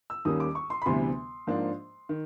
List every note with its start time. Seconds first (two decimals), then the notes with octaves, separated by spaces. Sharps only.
0.10 E6
0.25 D#2 D#3 G3 A#3 C#4 D#6
0.40 D6
0.55 C#6
0.70 C6
0.82 B5
0.86 D2 C3 E3 G3 B3 C6
1.47 G#2 F3 A#3 D4
2.09 D#3